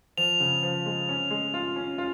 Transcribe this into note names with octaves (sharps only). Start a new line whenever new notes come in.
F3 F7
C#3
F3
G#3
C#4
G#3
F4
C#4
F4